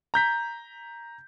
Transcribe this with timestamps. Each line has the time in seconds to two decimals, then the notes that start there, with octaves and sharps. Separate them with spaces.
0.14 A#5 G6 B6